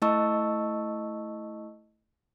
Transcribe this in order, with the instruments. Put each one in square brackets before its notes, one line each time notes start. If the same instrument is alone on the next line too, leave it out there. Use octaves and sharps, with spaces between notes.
[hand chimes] A3 E4 D#5 A5 C#6 E6